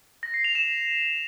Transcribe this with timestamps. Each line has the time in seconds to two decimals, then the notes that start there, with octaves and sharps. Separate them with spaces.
0.23 A#6
0.34 C7
0.44 F7
0.55 E7